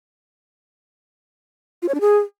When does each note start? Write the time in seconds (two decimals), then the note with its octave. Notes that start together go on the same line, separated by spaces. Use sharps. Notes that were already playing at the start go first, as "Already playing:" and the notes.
1.82 F4
1.88 C#5
1.95 D4
2.01 G#4